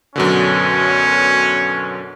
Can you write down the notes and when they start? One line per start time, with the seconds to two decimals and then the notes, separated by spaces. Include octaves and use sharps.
0.16 F#2 B2 D3 C#4